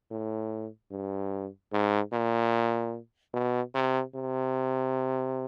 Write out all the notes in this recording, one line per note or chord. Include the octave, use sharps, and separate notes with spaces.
A2
G2
G#2
A#2
B2
C3
C3